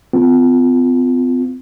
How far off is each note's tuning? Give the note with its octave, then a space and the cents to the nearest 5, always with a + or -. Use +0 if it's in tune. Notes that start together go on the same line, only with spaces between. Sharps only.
C4 -45 F4 +0